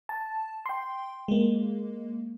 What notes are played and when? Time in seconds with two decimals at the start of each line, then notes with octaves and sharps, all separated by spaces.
0.09 A5
0.66 G5 C6
1.28 G#3 A#3